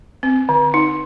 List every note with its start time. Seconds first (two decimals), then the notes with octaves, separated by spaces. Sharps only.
0.23 C4
0.49 D3
0.74 D#4